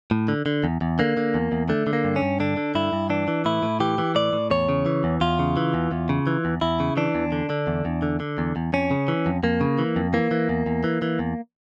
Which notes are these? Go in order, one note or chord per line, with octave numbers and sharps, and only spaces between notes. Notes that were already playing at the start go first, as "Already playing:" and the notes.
A2
D3
D3
E2
E2
D3 A#3
D3
E2
E2
D3 A3
D3
A#3
G2
C#4
G2
D3 D4
D3
G2 E4
G2
E3 D4
E3
A2 E4
A2
E3 G4
E3
A2 D5
A2
E2 C#5
C#3
E3
E2
E2 F4
C#3
E3
E2
E2
C#3
E3
E2
E2 E4
C#3
E3 D4
E2
D3
D3
E2
E2
D3
D3
E2
E2
F2 C#4
C#3
E3
F2
F2 A#3
C#3
E3
F2
E3 A#3
E3
E2
E2
E3
E3
E2